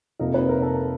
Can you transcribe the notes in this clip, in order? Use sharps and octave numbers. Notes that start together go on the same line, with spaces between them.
F2 C3 F3 A#3 D#4 A#4
B4
A#4
A4